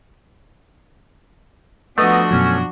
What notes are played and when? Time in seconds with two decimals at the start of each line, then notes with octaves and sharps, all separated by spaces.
1.98 F3 A3 B3 D4 F#4 D#5
2.31 F#2 B2 F#3 C#4